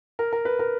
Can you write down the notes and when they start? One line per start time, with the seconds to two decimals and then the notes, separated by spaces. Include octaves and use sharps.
0.19 A#4
0.33 A#4
0.45 B4
0.59 A#4